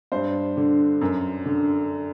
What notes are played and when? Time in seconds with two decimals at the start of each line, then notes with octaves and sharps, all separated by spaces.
0.12 G2 C5
0.57 D3
1.01 F#2
1.46 D3